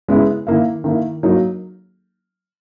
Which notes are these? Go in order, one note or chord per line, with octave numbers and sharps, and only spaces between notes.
C#3 G#3 B3 E4
D#3 A#3 E4
D#3 A#3 E4
F#3 A#3 D#4